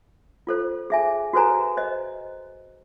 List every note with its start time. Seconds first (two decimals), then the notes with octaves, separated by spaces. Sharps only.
0.47 F4 A4 C5
0.90 G#4 E5 G#5
1.33 F#4 A4 B4 C5 G#5 A#5
1.77 C5 D#5